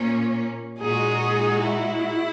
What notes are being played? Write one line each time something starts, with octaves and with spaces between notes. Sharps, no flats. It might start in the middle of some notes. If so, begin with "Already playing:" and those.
Already playing: A#2 A#3 C#4
A#2 G#3 D#4 F#4 G#4
E4